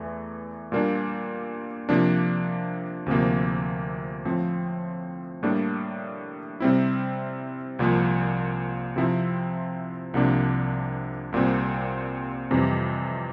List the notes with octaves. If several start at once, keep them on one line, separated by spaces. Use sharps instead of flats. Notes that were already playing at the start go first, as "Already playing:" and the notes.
Already playing: E2 E3 A3
A#2 G3 A#3 D4
C3 F3 A#3 D4
D2 C3 F3 A#3
A2 F3 C4
A2 G3 A#3 D4
C3 G3 C4 E4
C2 A#2 F3
C3 F3 C4 E4
C2 C3 F3 A#3 D4
C2 A#2 G3 C4
F2 C3 E3 G3